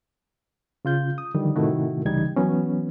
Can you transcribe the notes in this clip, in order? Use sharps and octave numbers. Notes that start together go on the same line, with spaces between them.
C#3 F4 G6
D#6
D3 D#3 F3 G3
A2 C3 D#3 A3 E4 F#4
C2 C#3 E3 G3 D#4 G#6
E3 F#3 B3 C#4